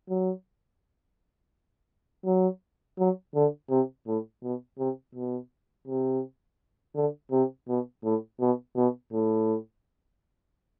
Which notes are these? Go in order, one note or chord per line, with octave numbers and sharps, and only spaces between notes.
F#3
F#3
F#3
D3
C3
A2
B2
C3
B2
C3
D3
C3
B2
A2
B2
B2
A2